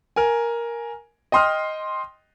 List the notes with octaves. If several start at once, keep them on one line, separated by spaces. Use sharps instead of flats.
A#4 G#5
D#5 G5 C6 D#6 F6